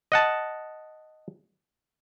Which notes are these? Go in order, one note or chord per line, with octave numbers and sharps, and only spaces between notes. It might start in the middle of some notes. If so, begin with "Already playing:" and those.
D#5 F#5 A5